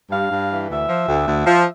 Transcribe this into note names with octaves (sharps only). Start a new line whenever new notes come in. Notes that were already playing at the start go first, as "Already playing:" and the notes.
G2 F5
G2
E3
D2 E5
F3
D2
D2
F3